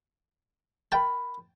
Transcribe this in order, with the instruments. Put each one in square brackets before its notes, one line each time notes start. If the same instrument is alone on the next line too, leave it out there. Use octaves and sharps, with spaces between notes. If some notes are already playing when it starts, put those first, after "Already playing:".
[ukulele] A#4 B5 [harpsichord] G5 A5